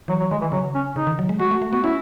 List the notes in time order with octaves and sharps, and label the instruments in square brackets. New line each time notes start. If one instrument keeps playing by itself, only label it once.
[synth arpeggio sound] E3 [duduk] F#3
[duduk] F#3
[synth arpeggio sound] D#3 [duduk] G#3
[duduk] E3
[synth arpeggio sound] C#3 [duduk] F#3
[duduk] C#4
[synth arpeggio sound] C#3 [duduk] D#4
[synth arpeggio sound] D#3
F#3
G#3
[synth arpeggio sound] G#3 [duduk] F#4
[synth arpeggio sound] A3
A3
[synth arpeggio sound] B3 [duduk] F#4
[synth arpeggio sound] C#4 [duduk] E4